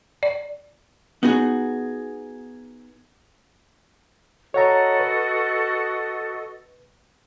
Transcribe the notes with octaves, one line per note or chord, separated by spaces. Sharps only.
D5
B3 D#4 F#4 G#4
F#4 A4 C#5 D#5 F#5 A#5
B4